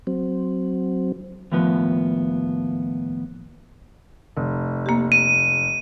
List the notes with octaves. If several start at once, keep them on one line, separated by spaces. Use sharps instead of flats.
F#3 C4
D#2 A2 F3 B3
F1
A#3 G4
D#7